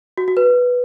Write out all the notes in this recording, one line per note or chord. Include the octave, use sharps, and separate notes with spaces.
F#4
F#4
B4